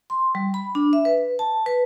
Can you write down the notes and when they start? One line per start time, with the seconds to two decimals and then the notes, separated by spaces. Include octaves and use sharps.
0.10 C6
0.35 G3
0.54 B5
0.75 D4
0.93 E5
1.05 B4
1.39 A5
1.66 B4